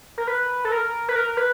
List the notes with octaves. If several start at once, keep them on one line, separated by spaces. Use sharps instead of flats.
A#4
B4
A4
A#4
B4
A#4
B4